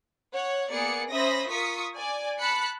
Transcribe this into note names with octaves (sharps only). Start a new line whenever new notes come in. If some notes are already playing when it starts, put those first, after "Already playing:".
C#5 F#5
A#3 B3 G#4 D5 C#7
C#4 C5 E5 B5 D#6 A#6
F4 A#4 C#6 D#6 B6 C#7
D5 G#5
A5 B5 F#6 C#7